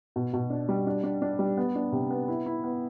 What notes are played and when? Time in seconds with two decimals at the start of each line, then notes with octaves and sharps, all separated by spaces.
0.16 B2
0.33 B2
0.50 D4
0.69 G3
0.87 D4
1.04 D4
1.22 D4
1.39 G3
1.57 B3
1.76 D4
1.92 C3
2.10 B3
2.28 E4
2.46 E4
2.64 B3